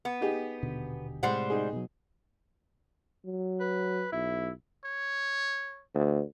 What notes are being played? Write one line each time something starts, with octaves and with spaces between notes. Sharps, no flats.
B3
D#4 G4 G#4
D#1 B2 D3
A2 C3 G3 G#3 C5 F#5
D#4 G#4
B2 F#3
F#3
B4
B1 E4
C#5
D2